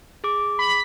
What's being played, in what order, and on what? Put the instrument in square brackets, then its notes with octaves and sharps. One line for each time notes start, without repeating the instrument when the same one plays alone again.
[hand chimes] G#4 D6
[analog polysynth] B5